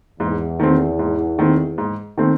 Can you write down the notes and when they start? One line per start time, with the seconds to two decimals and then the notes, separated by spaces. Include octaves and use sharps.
0.19 E2 G#2
0.60 D#3 A3 C4
0.99 G#2
1.39 D#3 A3 C4
1.78 G#2
2.18 D#3 A3 C4